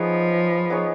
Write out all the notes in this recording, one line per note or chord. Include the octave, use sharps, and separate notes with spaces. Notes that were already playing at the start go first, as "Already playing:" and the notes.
Already playing: F3 B3 D#4 G#4 C#5
B3 D#4 G#4 C#5